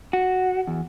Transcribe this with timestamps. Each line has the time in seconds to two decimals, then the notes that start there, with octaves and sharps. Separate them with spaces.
0.13 F#4
0.67 E2